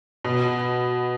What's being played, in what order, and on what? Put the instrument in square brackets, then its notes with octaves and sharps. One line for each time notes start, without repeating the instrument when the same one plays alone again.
[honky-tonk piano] B2